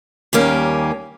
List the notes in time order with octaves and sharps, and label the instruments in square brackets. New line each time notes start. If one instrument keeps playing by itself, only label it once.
[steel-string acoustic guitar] D#2 D#3 G3 A#3 C#4